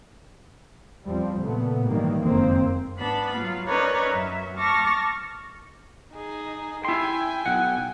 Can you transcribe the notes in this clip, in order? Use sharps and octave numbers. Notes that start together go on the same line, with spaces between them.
E2 F3 G3 C4
A#2 C#3 A3 B3
G#2 D#3 E3 F#3 G3 A#3
F#1 F2 D#3 G#3 A#3 C4
G#2 B3 D4 A5 B5
F#3 F4 F5
C#4 D#4 A#4 B4 C#5 D5
F#2 E5
A5 C#6 D6 F6 A6 A#6
D#4 G#4
E4 G5 G#5 C6
B1 F#5